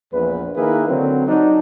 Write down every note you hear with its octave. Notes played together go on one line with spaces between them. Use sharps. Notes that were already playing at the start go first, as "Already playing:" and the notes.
A#1 E2 B4
D#3 A#3 E4 G#4 A#4 B4
D3 F#3 C4
F#3 D4 D#4